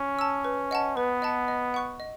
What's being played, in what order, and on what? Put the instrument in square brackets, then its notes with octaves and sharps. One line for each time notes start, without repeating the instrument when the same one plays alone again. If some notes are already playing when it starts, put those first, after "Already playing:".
Already playing: [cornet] C#4
[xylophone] A5 E6
B4
D#5 F#5 A5
[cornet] B3 [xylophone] B4
[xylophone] D#5 F#5 A5
D#5
F#5 C#6 F#6
D#5